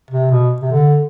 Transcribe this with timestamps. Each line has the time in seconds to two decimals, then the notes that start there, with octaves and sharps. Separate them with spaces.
0.11 C3
0.31 B2
0.62 C3
0.72 D3